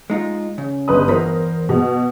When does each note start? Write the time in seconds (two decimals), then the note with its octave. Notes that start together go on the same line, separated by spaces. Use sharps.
0.10 G#3 D#4 F4
0.58 C#3
0.88 G1 B4 D#6
1.08 E2 A#4 C5 B5
1.69 B2